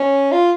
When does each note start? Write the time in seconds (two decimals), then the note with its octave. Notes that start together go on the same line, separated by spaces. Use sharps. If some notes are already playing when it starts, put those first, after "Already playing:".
Already playing: C#4
0.32 F4